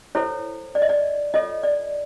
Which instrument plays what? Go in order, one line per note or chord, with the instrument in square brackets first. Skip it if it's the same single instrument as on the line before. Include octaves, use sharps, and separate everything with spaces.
[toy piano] E4 A4 C5 C#5
D5
D#5
D5
F4 A4 C#5 D#5
D5